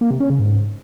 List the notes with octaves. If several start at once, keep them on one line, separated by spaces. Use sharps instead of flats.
A#3
C3
C#4
C#3
G#2